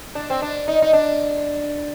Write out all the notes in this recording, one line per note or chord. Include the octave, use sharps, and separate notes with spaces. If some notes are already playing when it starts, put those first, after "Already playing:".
D4
C4
D4
D#4
D#4
D4